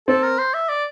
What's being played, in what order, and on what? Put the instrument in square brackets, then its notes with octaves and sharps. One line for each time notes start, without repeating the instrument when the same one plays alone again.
[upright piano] C4 [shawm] A4
[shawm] A#4
C5
E5
D5